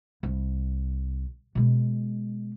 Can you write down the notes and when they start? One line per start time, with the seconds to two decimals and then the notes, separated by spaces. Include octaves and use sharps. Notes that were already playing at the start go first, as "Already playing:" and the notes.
0.23 C2
1.55 B2 G#3